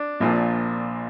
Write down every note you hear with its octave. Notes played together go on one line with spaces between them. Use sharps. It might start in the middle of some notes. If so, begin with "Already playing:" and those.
Already playing: D4
A#1 A#2 F3